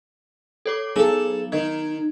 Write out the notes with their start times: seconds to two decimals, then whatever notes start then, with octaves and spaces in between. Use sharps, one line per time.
0.65 A4 C#5 D6
0.96 F#3 B3 D#4 G#4 A4
1.52 D#3 D#4 G#6